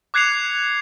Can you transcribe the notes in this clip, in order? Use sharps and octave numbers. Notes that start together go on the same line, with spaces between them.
D6 F#6 G#6 C7 C#7 F7